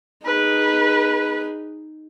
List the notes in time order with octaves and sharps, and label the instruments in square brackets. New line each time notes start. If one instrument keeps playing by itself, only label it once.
[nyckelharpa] D#4 G#4 [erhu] B4